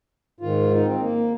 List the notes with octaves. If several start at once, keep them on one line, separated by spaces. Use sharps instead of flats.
G#2 D#3 F4
D#4
C4
A#3